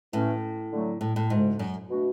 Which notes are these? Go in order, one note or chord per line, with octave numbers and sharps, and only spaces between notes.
A2 E3 A3 C#4
D3 F#3 A3
A2
A2
D2 G#2 C#3 G#3
F#2
B2 A3 D4 F#4